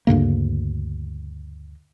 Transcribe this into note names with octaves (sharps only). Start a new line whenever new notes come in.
D2 G2 C#3 A#3